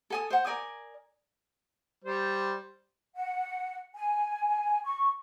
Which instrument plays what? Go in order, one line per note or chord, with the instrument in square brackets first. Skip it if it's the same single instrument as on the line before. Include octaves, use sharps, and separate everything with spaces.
[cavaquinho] A4 G#5 D#6
C5 F#5
A#4 D5 G#5 D#6
[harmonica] G3 C5
[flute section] F#5
G#5
C#6